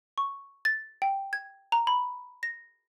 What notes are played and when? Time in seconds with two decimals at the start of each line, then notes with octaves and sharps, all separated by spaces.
0.18 C#6
0.65 A6
1.02 G5
1.33 G#6
1.72 A#5
1.87 B5
2.43 A#6